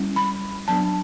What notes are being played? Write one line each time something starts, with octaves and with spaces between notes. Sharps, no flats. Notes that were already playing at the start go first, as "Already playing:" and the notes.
Already playing: G3 C#4 E4
B5
F#3 B3 D4 A5